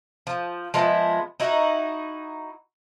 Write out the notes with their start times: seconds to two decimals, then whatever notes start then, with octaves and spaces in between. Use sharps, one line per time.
0.27 F3
0.74 F3 G#3 B3 E4
1.40 D#4 E4 F#4